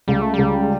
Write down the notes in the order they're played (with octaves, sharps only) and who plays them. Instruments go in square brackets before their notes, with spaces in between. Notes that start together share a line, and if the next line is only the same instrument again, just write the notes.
[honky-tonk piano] C#2 [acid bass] G3
[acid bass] A3
[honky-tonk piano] C#2 [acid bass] G3